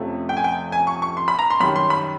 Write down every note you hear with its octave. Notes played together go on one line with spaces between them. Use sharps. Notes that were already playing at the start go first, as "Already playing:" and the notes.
Already playing: F2 C3 F3 A3 C#4
G5
G#5
G5
G#5
C#6
C#6
C6
B5
A#5
C6
F#2 D#3 G3 B5
C6
B5